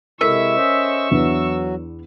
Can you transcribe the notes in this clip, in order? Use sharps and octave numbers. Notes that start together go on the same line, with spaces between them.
C3 G#3 E4 A4 A#4 E5 C#6 E6
C#4 C5 D#5
E2 F#3 B3 D4 F#4